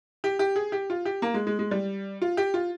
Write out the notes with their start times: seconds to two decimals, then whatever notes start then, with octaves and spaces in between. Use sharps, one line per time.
0.24 G4
0.39 G4
0.56 G#4
0.72 G4
0.90 F4
1.05 G4
1.22 A#3
1.34 G#3
1.47 G#3
1.59 G#3
1.71 G3
2.21 F4
2.37 G4
2.54 F4